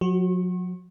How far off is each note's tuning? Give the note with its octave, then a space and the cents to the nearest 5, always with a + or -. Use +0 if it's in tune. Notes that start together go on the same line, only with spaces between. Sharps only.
F#3 -40 F#4 +20